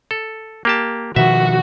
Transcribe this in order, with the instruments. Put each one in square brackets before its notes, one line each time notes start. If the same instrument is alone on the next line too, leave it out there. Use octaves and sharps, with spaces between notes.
[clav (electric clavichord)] A4
A#3 G4 A5
[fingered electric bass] B2 D#3 F3 [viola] F#4 [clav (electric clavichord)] E5